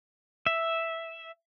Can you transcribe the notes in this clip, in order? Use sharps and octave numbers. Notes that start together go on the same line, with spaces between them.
E5